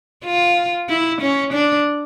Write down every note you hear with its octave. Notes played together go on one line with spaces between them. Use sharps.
F4
E4
C#4
D4